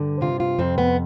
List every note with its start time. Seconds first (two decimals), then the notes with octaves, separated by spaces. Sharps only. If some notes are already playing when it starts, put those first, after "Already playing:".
Already playing: G2 D3
0.21 C3 F4
0.40 F4
0.59 F2 C4
0.78 B3